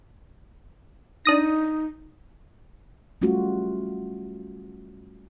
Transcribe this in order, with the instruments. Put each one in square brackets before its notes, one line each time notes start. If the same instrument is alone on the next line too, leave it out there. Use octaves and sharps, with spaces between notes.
[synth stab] D4 D#6 A#6 [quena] D#4
[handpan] G3 A3 C#4 F4 F#4